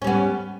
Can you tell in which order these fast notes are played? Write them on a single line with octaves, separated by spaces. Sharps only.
C#4 G3 B3